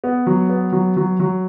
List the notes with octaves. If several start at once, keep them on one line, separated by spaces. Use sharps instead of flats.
B3
F#3
B3
F#3
F#3
F#3